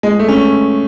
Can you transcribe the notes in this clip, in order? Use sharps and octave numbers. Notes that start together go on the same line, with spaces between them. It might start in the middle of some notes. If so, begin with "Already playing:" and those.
G#3
A3
C#4